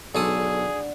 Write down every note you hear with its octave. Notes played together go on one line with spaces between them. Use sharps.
B1 D3 G#3 G#4 A4 D#6